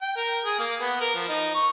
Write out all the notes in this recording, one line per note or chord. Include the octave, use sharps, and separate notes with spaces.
G5
A#4
G#4
A#3
B3
A#4
F3
D#4
C#6